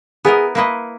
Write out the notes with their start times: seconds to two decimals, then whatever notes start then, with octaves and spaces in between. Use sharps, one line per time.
0.25 B3 E4 G#4 A#4 D#5
0.55 A#3 E4 B4 D#5